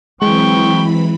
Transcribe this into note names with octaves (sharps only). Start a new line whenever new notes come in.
E3 F#3 G#3 C4 G5 B5 C#6